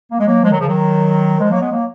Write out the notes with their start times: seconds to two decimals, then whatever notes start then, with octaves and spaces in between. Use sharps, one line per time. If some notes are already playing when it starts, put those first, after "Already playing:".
0.12 A#3
0.20 G#3
0.27 F#3 A#3
0.43 F3 G#3
0.51 D#3 F#3
0.60 C#3 F3
0.67 D#3 F#3
1.40 F3 G#3
1.50 F#3 A#3
1.62 G#3 B3
1.72 F#3 A#3